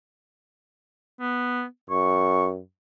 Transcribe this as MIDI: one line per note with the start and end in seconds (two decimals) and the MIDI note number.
1.20 1.64 59
1.90 2.60 42
1.90 2.47 85